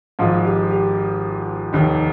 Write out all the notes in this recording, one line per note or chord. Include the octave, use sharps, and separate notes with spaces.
G#1 G#2 F3 F4
G4
G4
F1 D#2 D#3